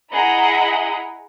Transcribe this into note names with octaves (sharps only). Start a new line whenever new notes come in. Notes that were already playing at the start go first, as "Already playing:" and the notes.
E4 G#4 D#5 F#5 A#5 B5